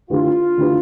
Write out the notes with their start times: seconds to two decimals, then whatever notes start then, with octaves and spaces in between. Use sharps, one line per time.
0.10 D3 A3 E4 F4 G4 B4
0.58 D3 A3 E4 G4 B4